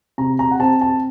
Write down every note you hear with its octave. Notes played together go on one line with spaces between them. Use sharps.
C3 A#5
A#5
F#5
C4 A5
A5